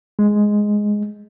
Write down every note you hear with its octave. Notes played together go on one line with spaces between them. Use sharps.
G#3